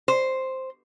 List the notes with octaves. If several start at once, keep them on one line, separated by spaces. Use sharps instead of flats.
C5